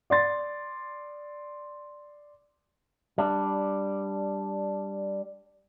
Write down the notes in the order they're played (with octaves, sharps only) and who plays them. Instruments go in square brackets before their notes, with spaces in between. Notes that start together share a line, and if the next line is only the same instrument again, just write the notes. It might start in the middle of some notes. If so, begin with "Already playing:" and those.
[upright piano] D5 C6 A6
[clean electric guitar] G3 D4